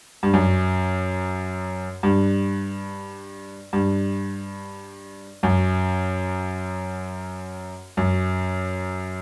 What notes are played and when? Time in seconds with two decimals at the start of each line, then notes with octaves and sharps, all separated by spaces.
0.23 G2
0.33 F#2
2.03 G2
3.73 G2
5.43 F#2
7.97 F#2